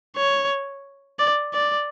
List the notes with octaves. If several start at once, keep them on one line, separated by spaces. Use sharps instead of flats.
C#5
D5
D5